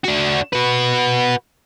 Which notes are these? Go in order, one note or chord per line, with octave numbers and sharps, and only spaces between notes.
D4 F#4
F#4 B4